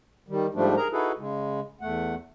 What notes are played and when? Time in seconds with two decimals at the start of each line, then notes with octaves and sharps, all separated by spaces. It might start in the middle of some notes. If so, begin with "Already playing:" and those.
0.29 D#3 G3
0.55 G#2 F3 G3 A3 D4
0.77 G#4 A#4 A#5
0.92 D#4 E4 F#4 G#4 A4 B4
1.18 C#3 G#3
1.81 E2 A3 F#5